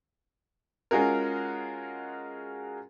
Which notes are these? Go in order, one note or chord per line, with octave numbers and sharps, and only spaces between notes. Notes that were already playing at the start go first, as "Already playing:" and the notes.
G#3 C#4 F4 F#4 G#4 A#4